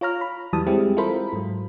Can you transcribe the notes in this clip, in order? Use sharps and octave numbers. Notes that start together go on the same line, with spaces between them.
F4 C#5 A#5 F6
B5
E2 E3 F#3 G3 A5 D#6
G3 G#3 C4 E4 G4 G#4
E4 F4 A4 A#4 C5 B5
G#2 F#3